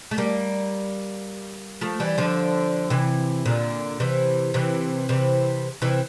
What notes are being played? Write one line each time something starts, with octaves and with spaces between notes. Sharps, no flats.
A3
G3 A#3
F3 A3
E3 G3
D3 F3
C3 E3
A#2 D3
C3 E3
C3 E3
C3 E3
C3 E3